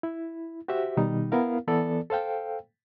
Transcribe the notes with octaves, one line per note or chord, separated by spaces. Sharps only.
E4
F#4 G4 C5 E5
B2 D#3 G3 D#4
B3 E4 A#4 F5
E3 B3 A4 D5
A4 C5 F5 G5